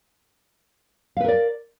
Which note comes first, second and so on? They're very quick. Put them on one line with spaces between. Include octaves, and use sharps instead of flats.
F5 B4 A#4 D5